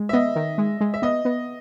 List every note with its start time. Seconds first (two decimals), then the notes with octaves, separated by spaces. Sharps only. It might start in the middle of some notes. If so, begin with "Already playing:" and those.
Already playing: G#3
0.09 E5
0.13 B3 D#5
0.36 D#3
0.58 G#3
0.81 G#3
0.94 E5
1.02 B3 D#5
1.25 B3